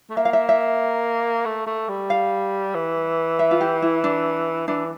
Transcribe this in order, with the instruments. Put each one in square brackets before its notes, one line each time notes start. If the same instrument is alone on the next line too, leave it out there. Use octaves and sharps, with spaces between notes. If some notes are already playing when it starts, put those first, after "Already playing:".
[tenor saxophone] A3
[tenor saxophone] A#3 [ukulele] E5
[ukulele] F5
E5
E5
[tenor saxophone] A3
A3
G3
[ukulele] F5
[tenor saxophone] E3
[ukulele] E5
F4
G4
E4
D4
[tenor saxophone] E3 [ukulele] D4